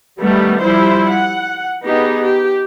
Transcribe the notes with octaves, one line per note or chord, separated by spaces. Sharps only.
D#3 G3 A3 B3
F3 G3 E4 C5
F#5
B3 D#4 G4 G#4
G4